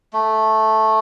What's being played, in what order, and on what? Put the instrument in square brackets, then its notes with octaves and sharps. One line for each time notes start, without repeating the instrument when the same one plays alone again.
[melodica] A3